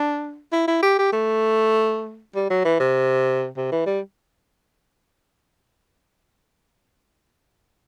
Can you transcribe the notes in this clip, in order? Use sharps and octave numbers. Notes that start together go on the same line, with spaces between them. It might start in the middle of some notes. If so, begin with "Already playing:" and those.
Already playing: D4
E4
E4
G4
G4
A3
G3
F#3
E3
C3
C3
E3
G3